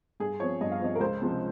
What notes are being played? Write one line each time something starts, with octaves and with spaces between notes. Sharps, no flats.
G2 G#4
F3 C4 C#5
G2 D#5
F5
F3 C4 D#5
A#4
C#2 C5
C3 F3 G#3 C#4